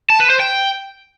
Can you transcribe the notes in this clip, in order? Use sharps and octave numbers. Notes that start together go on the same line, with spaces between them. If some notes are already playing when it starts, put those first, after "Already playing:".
A5
B4
C5
G5